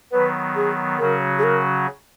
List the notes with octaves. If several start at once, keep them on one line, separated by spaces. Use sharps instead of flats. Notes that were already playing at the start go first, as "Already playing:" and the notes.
D#3 F#3 B3 B4
G#4
C#3 F#3 C#4 F#4 A#4
G#4
A#4